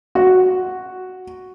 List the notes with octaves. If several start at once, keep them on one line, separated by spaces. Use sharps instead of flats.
F#4